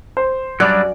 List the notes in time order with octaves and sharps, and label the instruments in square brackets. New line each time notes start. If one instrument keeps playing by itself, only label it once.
[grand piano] C5
[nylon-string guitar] F#2 D5 [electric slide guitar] F#3 G3 D4